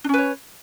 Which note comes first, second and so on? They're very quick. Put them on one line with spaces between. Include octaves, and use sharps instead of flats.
D4 C#4 B4 C#5